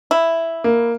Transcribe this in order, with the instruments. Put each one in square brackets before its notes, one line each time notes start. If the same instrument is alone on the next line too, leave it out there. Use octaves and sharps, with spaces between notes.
[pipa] E4
[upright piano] A#3